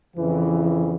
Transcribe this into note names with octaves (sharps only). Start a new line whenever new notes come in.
F2 C#3 E3